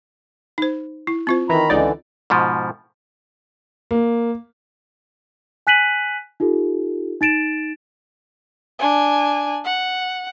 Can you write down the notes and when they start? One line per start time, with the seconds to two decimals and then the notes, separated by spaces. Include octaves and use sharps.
0.58 D#4 C5
1.07 E4
1.27 C4 F4 C5
1.49 D#3 E3 A#5 B5
1.70 C#2 D3 E3 D#4 D5
2.30 G#2 B2 F3
3.91 A#3
5.67 G#5 F#6 B6 D#7 F#7
6.40 D#4 F4 G4 A4
7.21 D#4 A6 D7 E7
8.79 D4 G#5
9.64 F#5